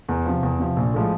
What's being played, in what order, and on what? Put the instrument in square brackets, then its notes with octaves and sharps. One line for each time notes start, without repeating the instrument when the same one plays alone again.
[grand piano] E2
C3 F3
E2
C3 F3
A#1
A2 F3 G#3